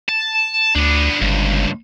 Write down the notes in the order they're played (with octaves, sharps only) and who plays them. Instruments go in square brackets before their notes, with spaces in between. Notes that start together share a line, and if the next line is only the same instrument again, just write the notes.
[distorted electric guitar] A5
[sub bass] D2 [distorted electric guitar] B3 D4
[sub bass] G1 [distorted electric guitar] C#2 G2